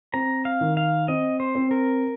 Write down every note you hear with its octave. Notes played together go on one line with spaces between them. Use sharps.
C4 A#5
F5
D#3
F5
C4 D#5
C5
C4
A#4